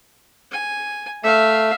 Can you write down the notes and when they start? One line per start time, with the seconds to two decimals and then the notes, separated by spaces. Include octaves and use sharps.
0.51 G#5
1.24 A3 E5 F5